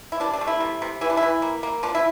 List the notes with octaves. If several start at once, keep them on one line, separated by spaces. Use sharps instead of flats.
E4
C3 D4
D4
A3
E4
C3
C3
E3 E4
D4
E4
E3
A#3
A#3
F3 D4
E4